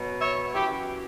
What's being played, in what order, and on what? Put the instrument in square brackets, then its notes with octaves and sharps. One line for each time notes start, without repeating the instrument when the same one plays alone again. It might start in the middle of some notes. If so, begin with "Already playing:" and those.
Already playing: [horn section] B2 F#3
C#5 E5
F#2 E3 E4 G4